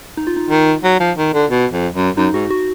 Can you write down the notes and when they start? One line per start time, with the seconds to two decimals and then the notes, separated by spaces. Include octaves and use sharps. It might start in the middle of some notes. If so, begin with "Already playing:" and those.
0.17 D#4
0.27 F4
0.36 D#4
0.50 D#3
0.84 F#3
1.00 F3
1.18 D#3
1.34 D3
1.51 B2
1.72 F2
1.95 F#2
2.17 F#2 D#4
2.34 G#2 F#4
2.50 F#4